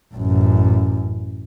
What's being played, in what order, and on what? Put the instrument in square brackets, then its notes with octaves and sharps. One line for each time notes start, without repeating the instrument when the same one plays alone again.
[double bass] A1 F#2